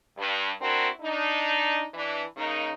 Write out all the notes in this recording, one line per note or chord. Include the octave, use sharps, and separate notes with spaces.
G2
C4 D4 E4 F#4 A#4
D4 D#4
E3 D4
C#3 A#3 D#4